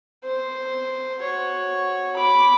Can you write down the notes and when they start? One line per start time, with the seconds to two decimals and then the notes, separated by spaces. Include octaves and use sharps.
0.25 C5
1.22 F#4 C#5
2.16 B5 D6